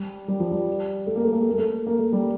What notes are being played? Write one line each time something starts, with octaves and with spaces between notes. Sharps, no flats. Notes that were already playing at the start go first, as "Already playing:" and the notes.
Already playing: G3
G3
F3
G3
A3
A#3
A3
A#3
A3
A#3
A3
A#3
A3
G3